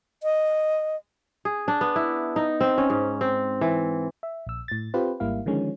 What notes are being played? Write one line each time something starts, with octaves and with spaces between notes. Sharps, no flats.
D#5
G#4
D4
B3
E4
D#4
C4
C#4
G#2
C4
E3
E5
A#1 E6
A2 A6
C4 F4 G4 B4 C5
G#1 G#2 G3 A#3 E4 F5
D3 D#3 F3 G#3 C#4